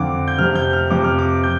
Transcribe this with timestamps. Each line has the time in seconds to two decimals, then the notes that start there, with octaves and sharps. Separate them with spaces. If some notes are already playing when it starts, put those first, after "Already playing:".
Already playing: F2 D3 D6
0.28 G6
0.38 F2 C3 F6
0.55 G6
0.73 F6
0.90 F2 C3 D6
1.04 F6
1.19 D6
1.44 G6